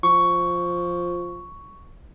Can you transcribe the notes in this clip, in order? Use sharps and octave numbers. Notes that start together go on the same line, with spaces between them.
F3 C#6